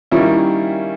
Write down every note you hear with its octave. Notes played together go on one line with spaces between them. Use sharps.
D#3 G3 A#3 C#4 E4